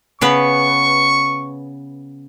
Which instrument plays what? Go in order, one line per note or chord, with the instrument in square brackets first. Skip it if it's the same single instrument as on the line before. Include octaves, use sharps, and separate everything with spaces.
[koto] C#3 B3 B4 [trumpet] C#6